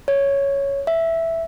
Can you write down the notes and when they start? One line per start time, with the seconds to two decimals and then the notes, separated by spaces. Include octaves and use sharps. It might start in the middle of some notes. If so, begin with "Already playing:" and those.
0.08 C#5
0.87 E5